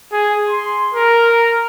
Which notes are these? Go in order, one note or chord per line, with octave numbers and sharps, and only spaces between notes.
G#4
C6
A#4